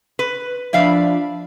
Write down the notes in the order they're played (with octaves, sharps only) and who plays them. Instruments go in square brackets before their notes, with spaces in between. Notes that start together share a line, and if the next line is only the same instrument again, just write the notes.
[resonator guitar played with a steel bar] B4
[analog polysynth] F3 D4 B5 [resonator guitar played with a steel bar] D5 E5 F5